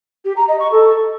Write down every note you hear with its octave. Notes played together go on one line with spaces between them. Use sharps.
G4
A#5
D#5
C#6
A4